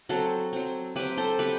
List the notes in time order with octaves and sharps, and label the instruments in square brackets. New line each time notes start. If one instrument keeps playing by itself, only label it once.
[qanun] F#3 C4 F#4 A4
F#3 C4
F#3 C4 G4 B4
A4 C5
F#3 C4 G4 B4